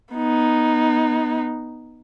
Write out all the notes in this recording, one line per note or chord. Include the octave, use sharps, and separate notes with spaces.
B3 D#4